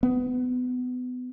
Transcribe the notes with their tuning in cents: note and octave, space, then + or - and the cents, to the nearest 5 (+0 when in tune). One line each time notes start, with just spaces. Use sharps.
B3 +25